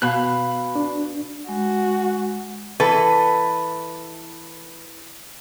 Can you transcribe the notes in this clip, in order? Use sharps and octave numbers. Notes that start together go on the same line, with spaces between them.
B2 F5 B5 F#6
D4
G#3 F#4
E3 A4 B4